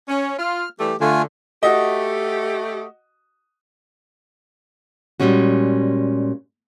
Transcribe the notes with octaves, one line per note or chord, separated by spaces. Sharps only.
C#4
F4 F6
E3 G3 A3 G4
D3 A3 F4 G#5
A3 F#4 G4 D#5
A#2 E3 G3 G#3 C#4 F#4